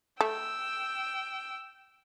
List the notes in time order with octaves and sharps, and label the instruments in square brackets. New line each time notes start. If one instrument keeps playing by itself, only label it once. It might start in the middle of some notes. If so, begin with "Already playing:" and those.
[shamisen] A3 [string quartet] G5 E6